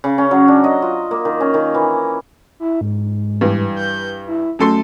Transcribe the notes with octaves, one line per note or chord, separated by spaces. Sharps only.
C#3
C#4
F#3
D4
D#5
F4
A#3
D#3
C#4
D#3
E3
E4
G#2
G2 E3
G6
E4
F#2 A3 A4 C6